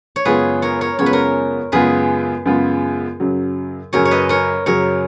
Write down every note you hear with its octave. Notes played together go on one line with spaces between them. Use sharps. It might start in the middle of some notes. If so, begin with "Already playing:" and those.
C#5
F#2 C#3 G#3 B3 F4 G#4 B4
A#4 C#5
A#4 C#5
F#2 C#3 G#3 B3 F4 C#5
B4
A#4 C#5
F#2 C#3 G#3 B3 F4 G#4 B4
F#2 C#3 G#3 B3 F4
F#2 C#3 F#3
F#2 C#3 F#3 A#4 C#5
C#5
B4 D#5
A#4 C#5
F#2 C#3 F#3 A#4 C#5